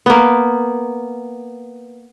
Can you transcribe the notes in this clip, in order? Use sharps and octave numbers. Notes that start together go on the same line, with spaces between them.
A#3 B3